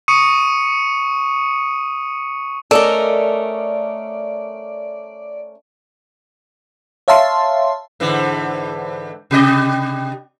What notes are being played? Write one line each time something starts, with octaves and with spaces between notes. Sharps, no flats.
C#6 D#6 C#7 D#7
A3 C#4 A4 A#4 D5 D#5
C#5 E5 F5 A5 C6
G#2 D3 E3
C3 G4 D#5